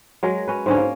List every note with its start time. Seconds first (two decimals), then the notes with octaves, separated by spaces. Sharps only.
0.23 F#3 G#3 A#4
0.48 C#4 B4
0.66 G#2 D3 C#4
0.77 A#3